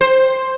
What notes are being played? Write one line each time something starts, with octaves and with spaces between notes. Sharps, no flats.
C5